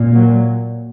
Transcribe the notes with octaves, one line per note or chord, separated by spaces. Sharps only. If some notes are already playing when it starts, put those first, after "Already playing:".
Already playing: A#2
F#3